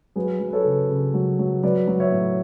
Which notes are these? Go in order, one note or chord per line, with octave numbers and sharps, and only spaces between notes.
F#3 G#4 B4
F#3
B4
A4 C#5
C#3
C#3
F#3
F#3
F#3 B4 D5
F#3
C#5 E5
A2